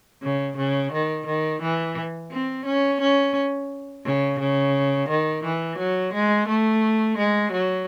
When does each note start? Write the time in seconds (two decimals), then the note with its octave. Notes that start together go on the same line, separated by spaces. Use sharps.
0.22 C#3
0.57 C#3
0.93 D#3
1.27 D#3
1.62 E3
2.31 C4
2.66 C#4
3.01 C#4
4.05 C#3
4.39 C#3
5.09 D#3
5.44 E3
5.78 F#3
6.14 G#3
6.48 A3
7.18 G#3
7.52 F#3